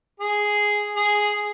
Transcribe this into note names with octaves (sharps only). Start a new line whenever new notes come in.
G#4
G#4